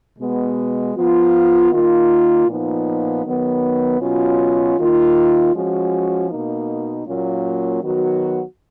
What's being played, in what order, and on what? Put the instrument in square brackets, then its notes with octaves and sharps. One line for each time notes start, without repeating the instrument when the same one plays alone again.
[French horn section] B2 G#3 B3
F3 B3 F4
D#3 A#3 F4
A#2 F3 B3 D#4
D#3 F#3 B3
B2 F#3 C#4 F4
D#3 A#3 F4
F3 G#3 C#4 F#4
B2 A#3 D#4
A#2 F#3 A#3 C#4 F4
D#3 F#3 B3 F#4